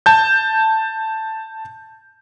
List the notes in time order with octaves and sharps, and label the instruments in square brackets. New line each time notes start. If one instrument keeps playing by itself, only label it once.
[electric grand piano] A5 G6